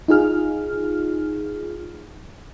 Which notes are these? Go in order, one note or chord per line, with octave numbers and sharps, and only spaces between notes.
D#4 F4 G#4 F6